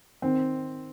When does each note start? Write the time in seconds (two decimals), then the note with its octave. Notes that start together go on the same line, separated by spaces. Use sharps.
0.22 D#3 C4